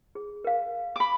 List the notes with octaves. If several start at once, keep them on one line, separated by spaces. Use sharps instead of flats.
G#4
A#4 F5
B5 D6